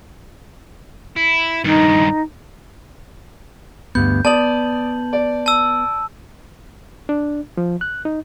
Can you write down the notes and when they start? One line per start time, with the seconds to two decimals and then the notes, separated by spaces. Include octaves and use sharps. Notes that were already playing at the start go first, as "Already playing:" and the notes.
1.16 E4
1.64 G2 D#3 D#4
3.95 D2 G2 B3 G6
4.25 B3 D5 A5 D#6 F#7
5.13 D5
5.46 A5 E6
7.09 D4
7.57 F3
7.81 F#6
8.05 D#4